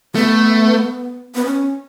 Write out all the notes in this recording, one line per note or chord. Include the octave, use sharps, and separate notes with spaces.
A3 B3
B3
C#4